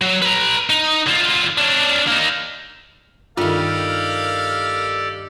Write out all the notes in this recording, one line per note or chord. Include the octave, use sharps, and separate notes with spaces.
F#3
B4 A#5
D#4
D3 F4
C#4 D4
A#3 D#4
G2 D#3 F4 G4 A4 A#4 D5 F5